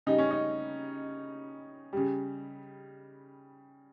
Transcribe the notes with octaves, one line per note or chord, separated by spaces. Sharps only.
C#3 G3 D#4
C#4
D#4
C#3 G3